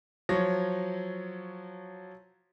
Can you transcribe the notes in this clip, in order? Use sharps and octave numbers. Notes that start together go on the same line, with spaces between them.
F3 F#3 C#5 A#6